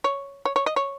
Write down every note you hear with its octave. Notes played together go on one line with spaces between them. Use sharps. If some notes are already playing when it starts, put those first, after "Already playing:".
C#5
C#5
C#5
D#5
C#5